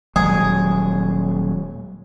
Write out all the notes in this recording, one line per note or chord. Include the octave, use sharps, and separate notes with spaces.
D#1 F#3 G#3 G#4